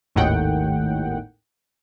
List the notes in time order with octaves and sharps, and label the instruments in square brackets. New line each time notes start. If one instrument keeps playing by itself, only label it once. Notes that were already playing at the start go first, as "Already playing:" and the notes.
[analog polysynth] G#1 D#2 A2 D#3 F#5 G5